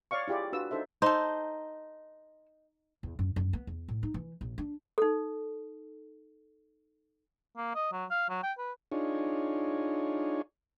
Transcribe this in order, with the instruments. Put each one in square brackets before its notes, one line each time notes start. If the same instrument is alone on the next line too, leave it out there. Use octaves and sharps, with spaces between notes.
[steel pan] C#5 D5 F5 C#6
E4 F4 G4 G#4 D5
D4 F4 F#4 B4 E6
D4 D#4 A4 C5 E5
[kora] D#4 [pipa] A4 C5
[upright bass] E2
F#2
F#2
B3
E2
A2
D#4
E3
A#1
D4
[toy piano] D#4 A4
[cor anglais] A#3
D#5
F#3
F5
F#3
G5
B4
[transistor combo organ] D4 D#4 F4 G#4 C#5